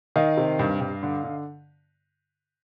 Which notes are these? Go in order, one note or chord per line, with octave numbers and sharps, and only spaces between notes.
D#3 D#5 F5
C3
G2
G2
D3
D3